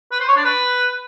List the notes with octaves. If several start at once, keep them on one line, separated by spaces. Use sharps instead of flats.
B4
C5
C#5
D4
B4